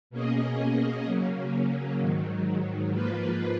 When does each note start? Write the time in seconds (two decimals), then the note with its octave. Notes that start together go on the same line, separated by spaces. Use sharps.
0.10 B2 A#3 C#4 G#4 D#5
1.05 C#3 F#3 A#3 C#4
1.99 G#2 D#3 F#3
2.93 G#2 F3 A#3 F4 B4